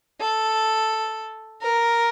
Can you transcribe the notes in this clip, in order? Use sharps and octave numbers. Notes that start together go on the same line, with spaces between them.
A4
A#4